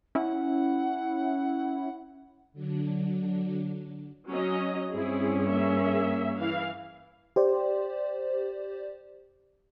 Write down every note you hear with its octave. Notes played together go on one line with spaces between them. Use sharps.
C#4 E4 F#5
D3 F#3 D4
F#3 C#4 D#5
G2 C4 C#4 E4 G#4
A#3 G#4 E5
E3 F5
G4 C5 D5